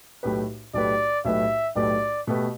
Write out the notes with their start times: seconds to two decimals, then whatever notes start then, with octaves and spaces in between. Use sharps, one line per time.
0.23 B1 A2 A3 G4 B4
0.74 B1 A2 A3 G4 B4 D5
1.25 B1 A2 A3 G4 B4 E5
1.75 B1 A2 A3 G4 B4 D5
2.27 B2 A3 G4 B4